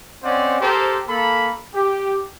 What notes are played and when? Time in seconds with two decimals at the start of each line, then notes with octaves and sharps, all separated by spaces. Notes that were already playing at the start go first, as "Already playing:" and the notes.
0.23 C4 C#4 C5 D5 D#5 F#5
0.60 G4 A4 A#4 C5
1.08 A#3 A4 B5
1.74 G4